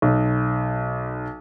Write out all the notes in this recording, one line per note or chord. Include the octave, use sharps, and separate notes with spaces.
B1